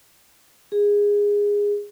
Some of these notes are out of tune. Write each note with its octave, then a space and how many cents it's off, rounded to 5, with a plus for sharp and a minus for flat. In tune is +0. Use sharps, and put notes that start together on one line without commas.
G#4 -20